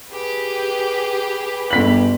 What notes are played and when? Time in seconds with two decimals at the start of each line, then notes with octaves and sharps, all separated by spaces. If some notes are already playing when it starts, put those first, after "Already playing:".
0.10 G4 G#4 B4
1.70 G1 B6 F#7